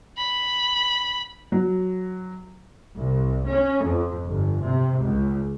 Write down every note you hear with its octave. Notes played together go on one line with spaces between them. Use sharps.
B5
F#3
C2
C#4
F2
G1
C3
C#2